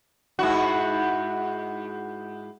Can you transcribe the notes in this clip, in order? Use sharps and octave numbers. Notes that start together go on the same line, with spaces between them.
G#2 E4 F#4